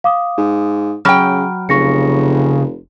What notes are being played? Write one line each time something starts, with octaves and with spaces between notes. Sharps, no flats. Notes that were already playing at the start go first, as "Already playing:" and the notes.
F5 D6 D#6
G#2
C#3 F#3 G5 B5 F6
F1 C#3 C#6 A#6 C#7